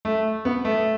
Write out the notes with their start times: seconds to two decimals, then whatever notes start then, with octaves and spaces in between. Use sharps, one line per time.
0.05 A3
0.45 B3
0.65 A3